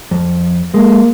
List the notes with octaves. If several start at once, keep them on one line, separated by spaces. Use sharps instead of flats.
F2
G#3 A#3